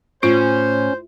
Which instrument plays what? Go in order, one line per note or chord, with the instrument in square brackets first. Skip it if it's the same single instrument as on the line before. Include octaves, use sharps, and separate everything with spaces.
[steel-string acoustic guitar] A2 [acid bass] C#4 [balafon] F4 [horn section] C5